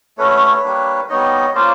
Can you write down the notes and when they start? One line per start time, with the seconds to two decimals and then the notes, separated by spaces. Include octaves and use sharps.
0.18 A3 C#4 F#4 B4 C#5
0.64 G3 A#3 D4
1.09 G3 B3 D#4 C#5 D#5
1.55 A#3 C#4 F4 C5 D5